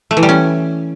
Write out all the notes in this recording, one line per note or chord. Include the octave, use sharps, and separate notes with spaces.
A3
E3
G3
C#4